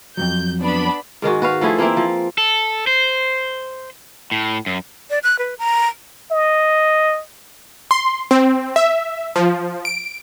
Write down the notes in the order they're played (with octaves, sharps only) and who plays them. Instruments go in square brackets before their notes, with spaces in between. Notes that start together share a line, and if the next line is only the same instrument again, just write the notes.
[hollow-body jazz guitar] F2 G#2 F#3 [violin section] G6
[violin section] B3 D4 B5
[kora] G#2 D#3 G#3 F#4
F#4 B4 F5
F3 A3 E4 G#4
E3 A#3 C4 E4
F3
[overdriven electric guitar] A4
C5
A2
F#2
[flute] D5
F#6
B4
A#5
[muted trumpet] D#5
[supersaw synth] C6
C4
E5
F3
D7